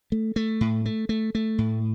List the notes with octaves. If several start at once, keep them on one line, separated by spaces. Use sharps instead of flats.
A3
A3
A2
A3
A3
A3
A2